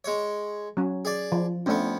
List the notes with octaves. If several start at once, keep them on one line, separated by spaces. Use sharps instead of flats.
G#3 C#5
F#3 C#4
G#4 D5
F3
F2 A3 B3 C#4 D4